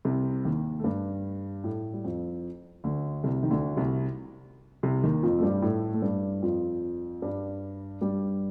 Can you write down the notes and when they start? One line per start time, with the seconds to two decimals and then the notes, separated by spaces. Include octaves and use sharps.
0.05 C2 C3
0.45 D#2 D#3
0.79 A3
0.84 G2 G3
1.64 A2 A3
1.93 G3
2.04 F2 F3
2.84 D2 D3
3.24 C2 C3
3.43 D#3
3.50 D2 D3
3.76 C2 C3
4.83 C2 C3
5.03 D#2 D#3
5.22 F2 F3
5.38 A3
5.42 G2 G3
5.62 A2 A3
5.94 A3
6.02 G2 G3
6.42 F2 F3
7.22 G2 G3
8.01 G2 G3